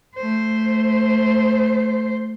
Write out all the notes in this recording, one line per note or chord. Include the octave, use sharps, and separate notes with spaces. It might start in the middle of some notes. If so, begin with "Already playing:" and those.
A3 C5